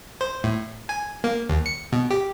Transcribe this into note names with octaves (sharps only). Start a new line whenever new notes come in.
C5
A2
G#5
A#3
D#2
C#7
B2
G4